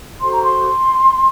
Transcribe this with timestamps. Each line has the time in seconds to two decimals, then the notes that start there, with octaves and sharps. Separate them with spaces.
0.20 F#4 A4 C5 C6
0.31 A#5
0.42 C6